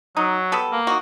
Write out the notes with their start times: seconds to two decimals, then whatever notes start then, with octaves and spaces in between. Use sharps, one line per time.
0.17 F#3 D#4
0.52 G3 B3 A4
0.72 A#3
0.87 D#4 F#4